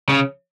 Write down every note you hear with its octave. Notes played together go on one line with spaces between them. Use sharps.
C#3